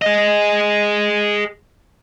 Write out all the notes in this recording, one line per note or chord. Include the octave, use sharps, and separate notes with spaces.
G#4 D#5